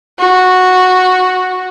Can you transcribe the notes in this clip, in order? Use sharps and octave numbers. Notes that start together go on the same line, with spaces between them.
F#4